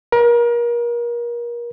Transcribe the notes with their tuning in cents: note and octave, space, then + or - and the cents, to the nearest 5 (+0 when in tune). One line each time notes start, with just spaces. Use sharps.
A#4 +30